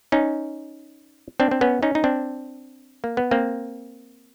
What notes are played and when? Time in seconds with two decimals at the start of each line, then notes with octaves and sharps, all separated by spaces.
0.12 C#4 D#4
1.40 C4 D4
1.51 C4
1.61 B3 C#4
1.83 C#4 D#4
1.95 D#4
2.04 C4 D4
3.04 A#3
3.17 B3
3.31 A#3 C4